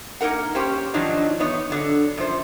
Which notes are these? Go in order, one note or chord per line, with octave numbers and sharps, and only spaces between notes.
A#3 D#4 A#4 F#5
A#3 C#4 G4 C5 G5
G#2 D#3 F3 F#3 D4 D#4
E2 B3 D#4 C#5
D3 F#3
F#2 F3 C5